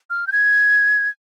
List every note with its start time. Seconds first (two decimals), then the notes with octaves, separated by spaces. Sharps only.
0.10 F6
0.27 G6
0.32 G#6